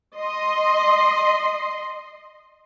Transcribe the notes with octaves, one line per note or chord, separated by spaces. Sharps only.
D#5 C6